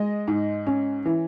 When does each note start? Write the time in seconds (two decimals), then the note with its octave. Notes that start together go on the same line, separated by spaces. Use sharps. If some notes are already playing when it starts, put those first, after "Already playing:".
Already playing: G#3 D#5
0.28 G#2
0.67 C#4
1.05 E3